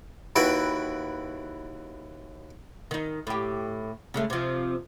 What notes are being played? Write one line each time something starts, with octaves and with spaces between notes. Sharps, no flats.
D#2 E4 F#4 B4 G5
D#3 D#4
A2 G4
C#3 G#3 A3
C3 F3